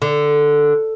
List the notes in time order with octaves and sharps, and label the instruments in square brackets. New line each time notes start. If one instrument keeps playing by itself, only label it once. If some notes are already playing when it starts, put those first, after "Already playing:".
[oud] D3